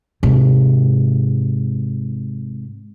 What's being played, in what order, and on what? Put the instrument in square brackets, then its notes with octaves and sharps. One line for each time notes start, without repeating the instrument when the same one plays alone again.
[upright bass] G#2 C3